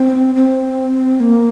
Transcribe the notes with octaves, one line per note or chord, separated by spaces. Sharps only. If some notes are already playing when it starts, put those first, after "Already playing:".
Already playing: C4
C4
A#3